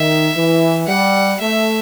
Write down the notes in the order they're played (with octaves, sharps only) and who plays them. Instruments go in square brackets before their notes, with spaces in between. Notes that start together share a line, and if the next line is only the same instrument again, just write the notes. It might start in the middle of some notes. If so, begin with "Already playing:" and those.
Already playing: [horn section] D#3 [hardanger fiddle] E5
[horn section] E3
[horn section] G3 [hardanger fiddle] F#5
[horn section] A3 [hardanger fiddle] E5